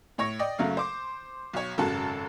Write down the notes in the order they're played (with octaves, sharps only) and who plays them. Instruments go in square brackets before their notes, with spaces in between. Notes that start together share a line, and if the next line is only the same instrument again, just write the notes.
[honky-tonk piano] A2 C#5 C#6 A#6
D5 D#5 G5
F#1 C#3 F#3 A3 F5
C5 D6
B1 C#5
G#1 F#2 C#3 F#4 A4 A5